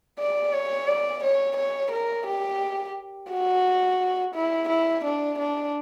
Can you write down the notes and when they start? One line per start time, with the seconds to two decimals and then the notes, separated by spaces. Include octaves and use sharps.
0.19 D5
0.53 C#5
0.88 D5
1.23 C#5
1.57 C#5
1.92 A#4
2.27 G4
3.31 F#4
4.35 E4
4.69 E4
5.05 D4
5.39 D4